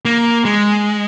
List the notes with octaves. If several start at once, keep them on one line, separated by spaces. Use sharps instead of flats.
A#3
G#3